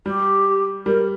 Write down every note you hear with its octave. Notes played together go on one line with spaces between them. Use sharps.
G3 G4
G3 A#4